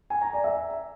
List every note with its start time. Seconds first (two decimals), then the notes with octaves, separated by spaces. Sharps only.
0.10 G#5
0.22 A#5
0.33 D5
0.44 E5